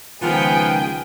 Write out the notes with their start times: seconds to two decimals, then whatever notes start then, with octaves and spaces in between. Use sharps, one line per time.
0.21 C#2 D#3 F3 B3 G#4 A#4 G5